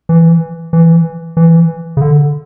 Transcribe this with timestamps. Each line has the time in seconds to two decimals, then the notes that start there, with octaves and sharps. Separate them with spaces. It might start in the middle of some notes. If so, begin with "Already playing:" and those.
0.09 E3
0.73 E3
1.37 E3
1.97 C#3
2.01 D3